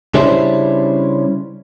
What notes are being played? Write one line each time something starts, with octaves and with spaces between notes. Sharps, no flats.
C#3 G3 C#4 D4 E4 C5